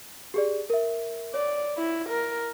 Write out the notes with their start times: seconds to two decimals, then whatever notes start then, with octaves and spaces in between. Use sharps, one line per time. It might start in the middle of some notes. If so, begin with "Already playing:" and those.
0.34 G4 G#4 D5
0.70 A#4 E5
1.34 C#5 D5
1.77 E4
2.09 A#4